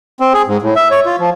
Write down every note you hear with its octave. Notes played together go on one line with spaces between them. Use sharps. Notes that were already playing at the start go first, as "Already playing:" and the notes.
C4
G#4
G#2
A2
E5
C#5
F4
F3